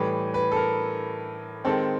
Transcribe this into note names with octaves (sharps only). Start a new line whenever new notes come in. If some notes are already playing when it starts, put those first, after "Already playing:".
Already playing: A2 E3 G3 B4
B4
A4
A#4
D#3 G#3 C4 A4